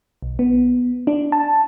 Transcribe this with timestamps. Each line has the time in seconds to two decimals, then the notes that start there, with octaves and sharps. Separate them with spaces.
0.22 B1
0.39 B3
1.07 D4
1.32 A5